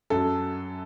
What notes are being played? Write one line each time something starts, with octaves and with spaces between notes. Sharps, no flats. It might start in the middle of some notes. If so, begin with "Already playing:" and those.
F#2 F#3 A4